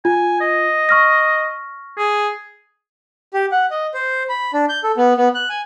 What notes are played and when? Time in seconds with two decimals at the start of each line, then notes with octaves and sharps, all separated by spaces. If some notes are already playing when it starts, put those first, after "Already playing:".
0.05 F4 G#5
0.41 D#5
0.89 C#6 F6 A#6
1.97 G#4
3.34 G4
3.51 F#5
3.71 D#5
3.94 C5
4.29 B5
4.54 D4
4.69 G6
4.84 A4
4.97 B3
5.17 B3
5.35 F#6
5.50 G#5